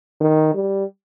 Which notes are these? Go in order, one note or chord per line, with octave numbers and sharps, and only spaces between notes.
D#3
G3